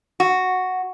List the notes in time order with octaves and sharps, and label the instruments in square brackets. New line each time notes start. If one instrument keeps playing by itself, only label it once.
[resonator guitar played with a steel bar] F#4